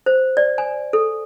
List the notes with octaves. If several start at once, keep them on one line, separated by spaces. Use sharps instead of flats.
C5
D5
G#5
A4